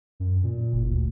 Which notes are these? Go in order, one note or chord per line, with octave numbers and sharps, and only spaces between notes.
F#2
A#2
F#1
D2